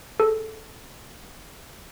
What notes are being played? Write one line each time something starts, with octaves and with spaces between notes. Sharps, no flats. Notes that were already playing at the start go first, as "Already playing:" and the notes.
G#4 A4